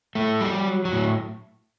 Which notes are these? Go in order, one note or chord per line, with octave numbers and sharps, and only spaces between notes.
A2 A3
F#3 G3
F#3
F#3
A2